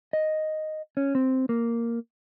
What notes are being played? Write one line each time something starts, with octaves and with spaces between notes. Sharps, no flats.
D#5
C#4
C4
A#3